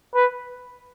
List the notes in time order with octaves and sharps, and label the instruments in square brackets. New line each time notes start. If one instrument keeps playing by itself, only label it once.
[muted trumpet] B4